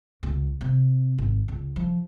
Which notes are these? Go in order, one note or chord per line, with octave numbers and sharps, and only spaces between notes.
C#2
C3
G#1
C#2
F3